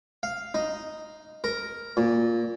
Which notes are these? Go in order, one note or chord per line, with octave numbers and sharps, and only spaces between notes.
F5
D#4
A#4
A#2